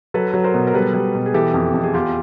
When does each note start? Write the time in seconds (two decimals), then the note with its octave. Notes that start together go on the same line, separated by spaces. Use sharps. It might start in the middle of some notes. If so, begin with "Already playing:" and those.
0.14 F#3 A4 B4
0.34 F#3
0.44 A#4 C5
0.54 B2
0.67 A#4
0.74 G3 A4 B4
0.94 G3
1.15 B2
1.26 G#4
1.34 E3 G4 A4
1.54 F2
1.74 F2
1.83 G#4
1.94 E2 F4 G4